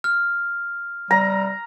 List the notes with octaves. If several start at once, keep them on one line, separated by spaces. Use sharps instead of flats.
F6
G3 A#5